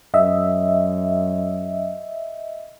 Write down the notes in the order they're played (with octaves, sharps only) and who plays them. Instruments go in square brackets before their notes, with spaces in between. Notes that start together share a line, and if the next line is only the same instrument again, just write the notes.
[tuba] F#2 [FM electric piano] D#5 E5